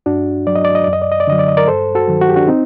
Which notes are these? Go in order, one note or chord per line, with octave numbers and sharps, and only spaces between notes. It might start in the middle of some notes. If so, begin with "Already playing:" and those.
G2 D4 F#4
F#3 D5
D#5
D5
D#5
F#2 D5
D#5
D5
D#5
D5
D3 F#3 D#5
D5
D#5
A#4 D5
G2 A4 C5
F#4 A4
D#3 F#3
F#4
G4
D4 F#4
C4 D#4